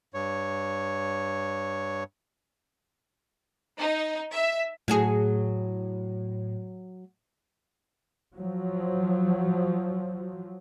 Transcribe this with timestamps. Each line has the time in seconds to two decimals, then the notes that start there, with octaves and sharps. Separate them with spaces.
0.14 G2 C#5
3.79 D#4
4.31 E5
4.88 A2 F#3 F#4 G#4
8.35 F3 F#3